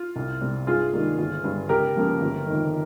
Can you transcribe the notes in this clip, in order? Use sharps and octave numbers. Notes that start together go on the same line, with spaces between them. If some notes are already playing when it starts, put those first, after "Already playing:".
Already playing: F4
C2
C3 G3 C4
G2 F4 G#4
D#3 G3 A#3
G1
G2 G3
C#2 G4 A#4
C#3 F3 A#3
G1
F2 D#3